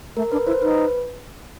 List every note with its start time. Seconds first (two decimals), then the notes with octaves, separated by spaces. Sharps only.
0.16 A3 A#4
0.32 D4 B4
0.46 E4 C5
0.62 D#4 B4